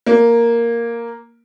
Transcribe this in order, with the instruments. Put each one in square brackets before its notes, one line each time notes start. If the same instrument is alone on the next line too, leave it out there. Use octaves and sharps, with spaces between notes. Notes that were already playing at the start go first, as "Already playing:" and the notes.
[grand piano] A#3